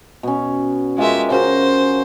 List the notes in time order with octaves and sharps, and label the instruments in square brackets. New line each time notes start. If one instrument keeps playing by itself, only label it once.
[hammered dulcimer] B2 C#4
[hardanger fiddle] G#3 E5 [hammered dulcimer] F4 G4 A#4
[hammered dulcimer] C#3 F#4 A#4 [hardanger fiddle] C5